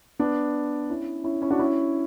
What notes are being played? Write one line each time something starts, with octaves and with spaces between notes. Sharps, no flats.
B3 D4
C#4 E4
C#4 E4
C#4 E4
D4 F#4
C#4 E4